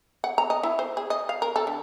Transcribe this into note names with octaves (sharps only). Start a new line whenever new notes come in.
F#5
A#5
D#5
E4
C5
G#4
D#5
F5
A#4
A4
D3